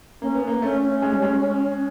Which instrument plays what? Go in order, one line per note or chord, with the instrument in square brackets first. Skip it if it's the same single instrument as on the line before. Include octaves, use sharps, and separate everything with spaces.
[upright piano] A#3 [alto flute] C#4
[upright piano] B3
A#3
[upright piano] A3 [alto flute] C#4
[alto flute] C#4
[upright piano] G#3
G3
G#3